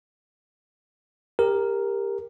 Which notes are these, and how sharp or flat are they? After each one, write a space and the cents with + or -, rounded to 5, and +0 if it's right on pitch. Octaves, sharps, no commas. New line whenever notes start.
G4 +25 A#4 +0